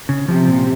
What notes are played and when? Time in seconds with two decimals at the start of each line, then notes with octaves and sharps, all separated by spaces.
0.09 C#3
0.27 C3 F3
0.47 A#2